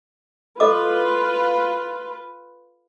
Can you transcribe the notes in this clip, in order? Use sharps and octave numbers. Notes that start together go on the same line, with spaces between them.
F4 A4 B4 D#5 D6